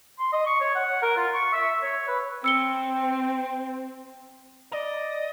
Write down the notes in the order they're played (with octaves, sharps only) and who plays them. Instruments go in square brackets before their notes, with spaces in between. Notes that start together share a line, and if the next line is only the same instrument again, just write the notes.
[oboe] C6
D#5
C#6
C#5
F#5
A#4
F4
C#6
E5
C#5
B4
[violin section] C4 [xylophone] E6 C#7 G7
[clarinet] D5 [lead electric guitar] D#5